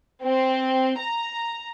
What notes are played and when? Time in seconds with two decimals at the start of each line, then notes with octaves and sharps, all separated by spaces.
0.24 C4
0.99 A#5